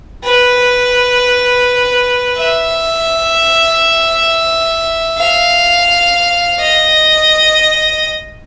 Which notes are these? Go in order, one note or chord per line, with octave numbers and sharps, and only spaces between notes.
B4
E5
F5
D#5